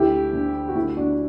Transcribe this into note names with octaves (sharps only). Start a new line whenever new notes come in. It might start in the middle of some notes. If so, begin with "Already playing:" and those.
Already playing: D2 E4 G4
D3
F#4
D2 E4
D4 F#4